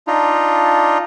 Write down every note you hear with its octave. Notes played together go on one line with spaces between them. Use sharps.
D4 D#4 F4